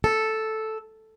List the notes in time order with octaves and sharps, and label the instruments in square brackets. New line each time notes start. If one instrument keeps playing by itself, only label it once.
[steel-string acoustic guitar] A4